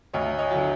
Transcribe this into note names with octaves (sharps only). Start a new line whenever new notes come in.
D2 C#5 D#5
C#5 D#5
D3 F#3